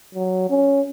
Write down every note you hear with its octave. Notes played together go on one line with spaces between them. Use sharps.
F#3
C#4